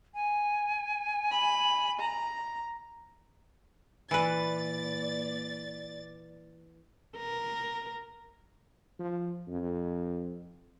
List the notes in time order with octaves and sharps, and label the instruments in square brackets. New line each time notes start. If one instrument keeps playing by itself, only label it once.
[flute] G#5
[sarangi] B5
A#5
[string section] A#2 D5 A6 [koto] E3 B4
[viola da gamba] A#4
[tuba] F3
F2